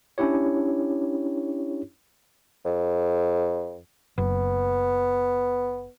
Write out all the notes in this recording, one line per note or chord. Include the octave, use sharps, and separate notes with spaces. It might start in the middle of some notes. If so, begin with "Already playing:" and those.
C#4 D4 E4 G4 C#5
F2
F#1 B3